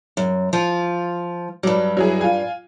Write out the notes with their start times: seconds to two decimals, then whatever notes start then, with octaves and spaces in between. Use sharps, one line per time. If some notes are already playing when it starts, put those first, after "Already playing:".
0.17 F#2
0.53 F3 F4
1.63 G2 F#3 G3
1.97 F#3 E4 G#4
2.21 F4 G#5